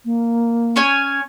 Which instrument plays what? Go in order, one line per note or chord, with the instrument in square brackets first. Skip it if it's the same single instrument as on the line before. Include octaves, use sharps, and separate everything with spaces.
[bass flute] A#3
[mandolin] C#4 C#5 G#5